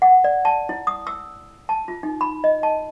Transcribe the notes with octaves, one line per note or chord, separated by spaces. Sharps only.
F#5
D5
A5
E4
D#6
E6
A5
F4
D#4
B5
D#5
A5